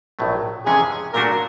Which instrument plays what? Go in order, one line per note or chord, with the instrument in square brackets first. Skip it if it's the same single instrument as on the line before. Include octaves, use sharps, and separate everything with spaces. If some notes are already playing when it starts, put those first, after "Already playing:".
[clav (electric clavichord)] A#1 A2 F#3 A3
[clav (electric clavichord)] F2 C3 E3 G#3 C#4 [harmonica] G#4
[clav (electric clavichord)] A#2 F#3 A3 D4 F#4 [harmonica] A#4